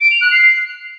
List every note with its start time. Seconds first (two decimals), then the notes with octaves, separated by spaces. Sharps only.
0.01 D7
0.11 F7
0.21 F#6
0.32 C7